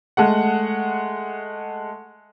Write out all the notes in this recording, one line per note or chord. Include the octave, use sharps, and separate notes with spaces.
G#3 A3 F#5